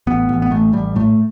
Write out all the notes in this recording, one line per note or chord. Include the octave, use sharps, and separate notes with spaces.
A1 B3
A1
B3
A1 A3
A1 G3
A2 A3